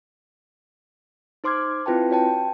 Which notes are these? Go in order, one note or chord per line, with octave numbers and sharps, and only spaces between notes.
D#4 C5 C6 D6 F6 G#6
C4 E4 F4 B4 G5 A5
F#4 C#5 G5 A5